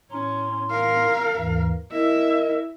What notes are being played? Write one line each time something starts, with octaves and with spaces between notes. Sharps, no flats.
A2 C#4 A#5 C6
A#4 F5
D#2 G#2 E3
E4 A#4 D#5 E5